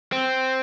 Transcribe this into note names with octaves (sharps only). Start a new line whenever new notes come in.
C4